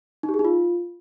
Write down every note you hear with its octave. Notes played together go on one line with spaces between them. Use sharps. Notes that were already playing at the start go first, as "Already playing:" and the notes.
D#4
G4
G#4
D#4
F4